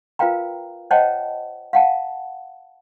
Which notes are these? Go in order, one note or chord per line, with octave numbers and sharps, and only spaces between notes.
F4 A#4 B4 F5 G5 A#5
C5 C#5 D#5 F#5 G5 A5
F5 F#5 A5